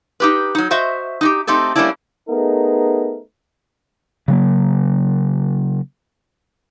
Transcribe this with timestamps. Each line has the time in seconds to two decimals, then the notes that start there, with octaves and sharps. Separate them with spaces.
0.20 D#4 G4 B4
0.55 F#3 D#4
0.71 F#4 C5 D#5 E5
1.21 D#4 F#4 G4
1.47 A3 C4 D#4 G4 A4
1.75 G3 A3 A#3 C#4 D4 E4
2.29 A3 B3 D#4 G#4 A#4
4.28 C#3 F#3 A#3